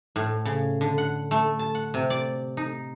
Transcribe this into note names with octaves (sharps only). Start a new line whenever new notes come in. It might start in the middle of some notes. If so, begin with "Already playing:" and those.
A2
C#3
D3
F#5
A3
A5
F#5
C3
D5
D#4